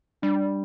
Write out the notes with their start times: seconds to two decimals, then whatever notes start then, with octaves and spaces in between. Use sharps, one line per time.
0.22 G3 D4